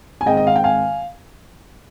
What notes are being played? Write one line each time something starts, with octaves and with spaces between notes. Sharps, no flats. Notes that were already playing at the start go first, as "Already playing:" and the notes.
G#5
G#2 D#3 G#3 C4 D#5 G5
D#5
F5
G5
F5 G#5